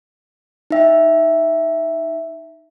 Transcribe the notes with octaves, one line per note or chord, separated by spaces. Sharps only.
D#4 E5 G5